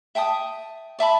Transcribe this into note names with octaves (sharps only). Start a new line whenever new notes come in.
E5 G5 A5 D#6
D5 E5 A5 B5